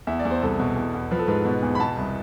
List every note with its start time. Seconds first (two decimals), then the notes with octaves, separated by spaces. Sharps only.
0.07 E2 E5
0.19 D5
0.25 E2
0.30 C5
0.42 C2 A4
0.59 B2
0.76 E2
0.94 E2
1.11 F3 B4
1.19 A4
1.28 G#2 B4
1.45 B2
1.62 E2
1.75 B5
1.79 B2 A5
1.97 C2